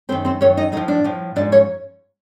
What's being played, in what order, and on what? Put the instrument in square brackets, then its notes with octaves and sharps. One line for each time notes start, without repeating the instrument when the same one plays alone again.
[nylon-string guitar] F#2 D#3 C4 C5
C4 C5
F#2 D#3 C#4 C#5
D#4 D#5
A2 D#4 D#5
F3
D4 D5
A2 F3
G#2 F3 D4 D5
C#4 C#5